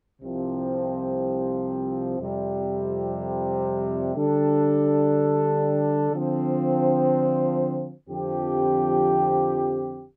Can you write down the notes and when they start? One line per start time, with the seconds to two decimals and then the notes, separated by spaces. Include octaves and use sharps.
0.22 C2 C3 F3 C4
2.19 F2 C3 G3
4.15 D3 G3 D4 A4
6.12 D3 F3 C4
8.09 F2 D3 F3 C4 G4